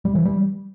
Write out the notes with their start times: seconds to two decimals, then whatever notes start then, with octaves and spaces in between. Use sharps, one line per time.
0.05 G3
0.15 E3
0.25 G3